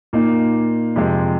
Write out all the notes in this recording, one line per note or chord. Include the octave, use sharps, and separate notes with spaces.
A#2 A#3 D#4
F2 C3 G#3